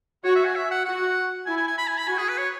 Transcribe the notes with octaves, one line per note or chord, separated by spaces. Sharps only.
F#4 C#5
E5
G#5
E5
F#5
F#4 F#5
E4 G#5
G#5
G#5
B5
G#5
B5
F#4 G#5
G#4
B4
C#5